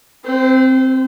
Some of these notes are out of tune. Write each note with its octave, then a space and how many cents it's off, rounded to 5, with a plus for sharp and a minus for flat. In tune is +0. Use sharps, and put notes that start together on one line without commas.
C4 +0 C5 -30